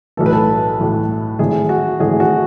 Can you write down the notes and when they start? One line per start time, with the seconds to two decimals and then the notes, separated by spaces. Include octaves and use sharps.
0.17 B1 A2 E3 A3 A4
0.26 B4
0.33 A4
0.78 B1 A2 E3 A3
1.39 G#1 G#2 E3 A3 E4 G#4
1.69 F#4
2.00 G#1 G#2 E3 A3 E4 G#4
2.20 F#4